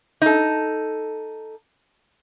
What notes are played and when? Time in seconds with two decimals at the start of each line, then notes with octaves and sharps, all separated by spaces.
0.22 D#4 A4